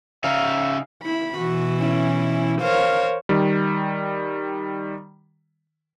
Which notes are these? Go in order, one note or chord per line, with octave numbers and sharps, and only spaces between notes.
C#3 D#4 E5 F5
E4 B5
B2 E3 F#4
C#4 E4
A#4 C5 C#5 F5
D#3 G3